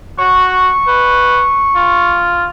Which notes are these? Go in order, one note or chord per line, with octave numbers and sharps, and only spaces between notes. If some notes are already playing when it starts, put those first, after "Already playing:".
F#4 C#6
B4
F4